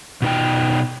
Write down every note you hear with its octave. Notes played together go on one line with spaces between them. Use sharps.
B2 D#4 G5